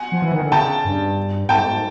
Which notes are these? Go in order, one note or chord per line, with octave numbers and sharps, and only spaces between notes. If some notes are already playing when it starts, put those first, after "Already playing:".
Already playing: F#5 G#5
F3
E3
D#3
D3
C#3 G5 A5
G2
G#2 G5 A5